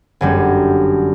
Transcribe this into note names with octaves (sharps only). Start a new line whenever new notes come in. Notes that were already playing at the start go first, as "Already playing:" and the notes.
G1 F#2 G3